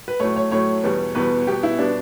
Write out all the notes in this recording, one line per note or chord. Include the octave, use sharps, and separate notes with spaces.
B4
A2 F#3 A3 C#5
C#5
A2 F#3 A3 C#5
E2 B2 G3 B3
E2 B2 G3 B3 B4
B2 G3 B3 G4
E4
B2 G3 B3 D4